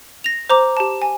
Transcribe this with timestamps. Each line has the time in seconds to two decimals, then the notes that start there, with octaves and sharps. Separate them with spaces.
0.24 A#6 F7
0.50 C5 A#5 D6
0.77 G4 A5
1.02 G#5